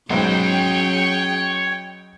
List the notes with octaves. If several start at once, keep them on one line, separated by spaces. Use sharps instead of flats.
B1 G#2 F#3 C#4 G#4 C#5 G5 C6